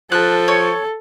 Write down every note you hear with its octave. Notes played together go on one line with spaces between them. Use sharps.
F3 A4 F#6
C#5